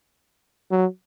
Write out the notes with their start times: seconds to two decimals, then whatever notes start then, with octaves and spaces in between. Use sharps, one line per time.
0.71 F#3